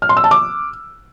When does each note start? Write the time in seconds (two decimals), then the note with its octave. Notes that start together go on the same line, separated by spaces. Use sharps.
0.02 F6
0.09 C6
0.17 E6
0.24 A5
0.31 D6